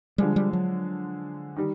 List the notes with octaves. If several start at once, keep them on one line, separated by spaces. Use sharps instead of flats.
D3 F3 G3 G#3
G3
F#3
D#3 G3